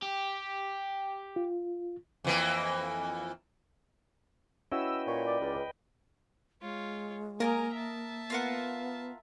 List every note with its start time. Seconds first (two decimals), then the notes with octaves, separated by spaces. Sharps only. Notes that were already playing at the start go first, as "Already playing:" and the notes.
0.02 G4
1.36 F4
2.24 F2 E3 A#3
4.72 C#4 E4 F#4 B4 D#5 G5 E6
5.07 A#2 C#5
5.26 D5
5.40 C#2
6.62 G#3 F4 C#5
7.40 A#3 A#4 D5 D#5 G#5 A#5
7.73 E5 A5
8.30 B3 F4 A#4 F#5